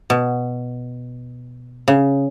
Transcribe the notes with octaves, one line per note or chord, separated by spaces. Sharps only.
B2
C#3